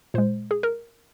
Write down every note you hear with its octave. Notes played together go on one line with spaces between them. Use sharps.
A#2 G#3 C5
G#4
A#4